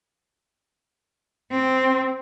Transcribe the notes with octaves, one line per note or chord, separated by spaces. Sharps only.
C4